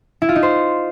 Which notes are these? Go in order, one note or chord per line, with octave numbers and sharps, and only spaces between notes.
E4
F4
D#4
C5